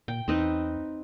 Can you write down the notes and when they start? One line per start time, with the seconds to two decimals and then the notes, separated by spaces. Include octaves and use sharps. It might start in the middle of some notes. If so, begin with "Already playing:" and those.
0.08 A#2 G5
0.28 E2 C4 D#4 B4